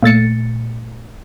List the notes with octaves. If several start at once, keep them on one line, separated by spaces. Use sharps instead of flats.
A#2 A3 A6 C#7